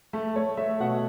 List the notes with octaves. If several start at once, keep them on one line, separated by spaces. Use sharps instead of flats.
A3
A3 C#5
A3 E5
B2 F#5